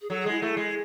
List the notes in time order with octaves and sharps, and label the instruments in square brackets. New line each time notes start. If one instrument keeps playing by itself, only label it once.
[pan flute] G#4
[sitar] F#3 [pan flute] A4
[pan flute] G#4
[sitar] G#3
[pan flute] E4
[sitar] A3 [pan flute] E4
[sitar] G#3